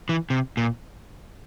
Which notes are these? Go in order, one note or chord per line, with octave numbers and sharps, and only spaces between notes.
E3
C3
A#2